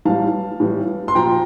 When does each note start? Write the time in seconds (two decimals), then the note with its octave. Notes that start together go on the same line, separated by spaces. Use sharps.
0.05 A2 E3 G3 F5 A5
0.60 A2 E3 G3
1.08 C6
1.15 A#2 F3 G5 A#5